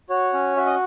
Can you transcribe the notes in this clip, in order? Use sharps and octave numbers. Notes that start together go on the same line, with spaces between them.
F#4 C#5
C#4
F#4 E5
D#5